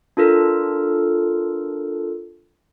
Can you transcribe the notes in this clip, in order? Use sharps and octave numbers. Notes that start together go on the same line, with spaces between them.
D4 F4 A4 A#4